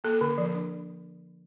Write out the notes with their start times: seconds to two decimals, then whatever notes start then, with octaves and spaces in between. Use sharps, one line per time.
0.04 A#3 A4
0.21 D3
0.38 F3
0.55 D4